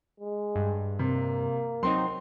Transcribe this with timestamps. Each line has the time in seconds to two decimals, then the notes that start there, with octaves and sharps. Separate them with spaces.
0.20 G#3
0.55 G2
0.99 C3 A#3
1.83 F#3 C4 D#4 C6